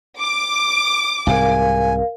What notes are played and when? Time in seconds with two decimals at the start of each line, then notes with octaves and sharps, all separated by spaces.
0.20 D6
1.27 C2 G#2 C3 A#4 F5 G#5